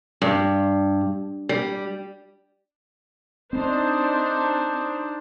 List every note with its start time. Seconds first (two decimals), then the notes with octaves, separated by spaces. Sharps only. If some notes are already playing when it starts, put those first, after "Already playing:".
0.22 G2
1.49 G3
3.53 C4 D4 D#4 C5